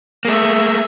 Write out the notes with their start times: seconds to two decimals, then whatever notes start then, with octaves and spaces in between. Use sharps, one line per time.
0.25 A3 A#3 G#4 E5